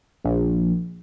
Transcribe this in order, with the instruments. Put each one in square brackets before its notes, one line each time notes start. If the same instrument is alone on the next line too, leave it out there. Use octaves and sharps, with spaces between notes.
[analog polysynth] A#1